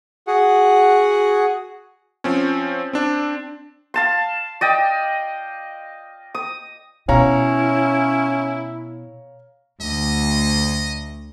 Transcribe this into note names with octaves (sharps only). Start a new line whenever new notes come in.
F#4 G#4 F#5
F3 C4 C#4
C4 D4
F5 A5 C6
D5 D#5 G5
D#6
B2 C#4 E4 C#5 F5 A#5
D2 D#5